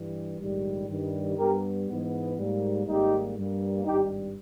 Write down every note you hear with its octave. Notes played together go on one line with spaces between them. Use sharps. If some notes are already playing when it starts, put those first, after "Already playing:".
Already playing: G2 E3 G3
A#1 G#2 D#3 G3
G2 D#3 G3
G2 G3 B3 G4 A#4
G#2 E3 G#3 B3
G#2 G3 A#3
G#1 G#2 G3 A#3 D#4 G4
G2 G3 A#3
G#1 G2 G3 D#4 G4